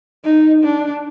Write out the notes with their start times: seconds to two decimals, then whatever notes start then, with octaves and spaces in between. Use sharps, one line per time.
0.25 D#4
0.64 D4